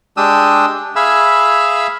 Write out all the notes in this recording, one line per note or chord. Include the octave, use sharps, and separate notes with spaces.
G#3 D4 G4 D#6 E6
G#4 E5 F5 G#5 B5 E6